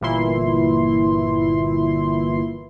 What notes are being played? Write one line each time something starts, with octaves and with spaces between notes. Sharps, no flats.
G1 A#2 E3 E4 C6